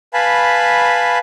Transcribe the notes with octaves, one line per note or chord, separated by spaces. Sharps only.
B4 F5 G#5 A5 B5